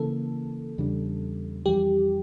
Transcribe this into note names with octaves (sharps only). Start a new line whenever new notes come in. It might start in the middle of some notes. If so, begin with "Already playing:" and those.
Already playing: C#3 E3 A#3 A4
E2 C#3 G3 D4
F2 E3 G3 G4